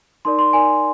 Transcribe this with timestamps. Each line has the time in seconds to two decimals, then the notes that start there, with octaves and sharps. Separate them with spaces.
0.25 D#4 A#4 D5 C6
0.39 C6
0.53 D#4 A#4 D5 G#5